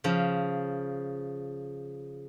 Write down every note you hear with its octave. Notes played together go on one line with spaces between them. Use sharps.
C#3 F3